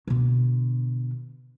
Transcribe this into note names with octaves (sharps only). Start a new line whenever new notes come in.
B2 D3